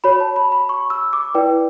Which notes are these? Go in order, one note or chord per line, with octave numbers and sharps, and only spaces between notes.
F#4 C#5 B5
A5
B5
B5
C#6
E6
D6
E4 B4 D5 G5